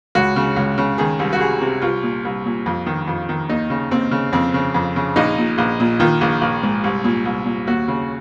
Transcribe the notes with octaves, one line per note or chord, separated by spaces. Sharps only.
C#2 F#4
C#3
C#2
C#3
D#3 G#4
C2
F#4
C2 G#4
C3
C2 F4
A#2
C2
A#2
F2
D#3
F2
D#3
D#2 D#4
C#3
D#2 C4
C#3
F2 C4
C#3
F2
C#3
A#1 D#4
A#2
A#1
A#2
D#3 F4
A#1
A#1
G#2
C2
A#2
C2
A#2
D#2 F#4
C#3